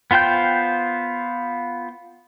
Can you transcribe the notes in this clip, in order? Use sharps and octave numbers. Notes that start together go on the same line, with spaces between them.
B3 F4 C5 G5 G6